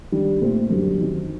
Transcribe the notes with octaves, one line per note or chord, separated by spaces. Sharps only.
D#3 G3 D4
A#2 A3 C4
F#2 D3 G3
F#2 D#3 F#3 C4 D#4